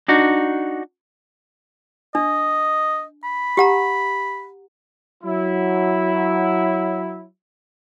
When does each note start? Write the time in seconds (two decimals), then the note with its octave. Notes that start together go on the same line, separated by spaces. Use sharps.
0.08 D4 D#4 F#4
2.15 D4 D#5
3.24 B5
3.57 G4 F#5 A#5
5.23 F#3 E4